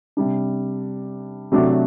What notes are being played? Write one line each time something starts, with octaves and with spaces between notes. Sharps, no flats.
C3 G3 D4
C3 F#3 A3 D4 F#4